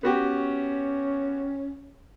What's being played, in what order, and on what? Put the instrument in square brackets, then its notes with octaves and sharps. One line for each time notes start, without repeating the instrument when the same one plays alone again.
[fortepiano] B3 F#4 G4 [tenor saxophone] C#4